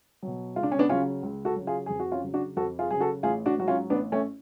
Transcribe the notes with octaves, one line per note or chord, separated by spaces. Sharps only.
B2 F#3
C#2 F4
D4
C#4
B3 D4
C#3 F#3 C#4 F4
C#2
F#4 A4
C#3 F#3
F4 G#4
F2 G#4
F#4
C#4 F4
C#3 F#3
D4 F#4
F2 F#4 A4
F4 G#4
C#3 F#3 G#4
F#4 A4
A1 F4 G#4
D4 F#4
G#2 F#3 F#4
C#4 F4
A1 B3 D4
A3 C#4